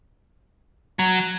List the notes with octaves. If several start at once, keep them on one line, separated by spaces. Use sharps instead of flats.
F#3